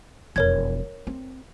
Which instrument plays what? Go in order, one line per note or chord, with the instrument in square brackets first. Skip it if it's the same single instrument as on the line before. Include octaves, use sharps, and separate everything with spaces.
[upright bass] E1 F2 [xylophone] A#4 C#5 G#6
[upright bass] C4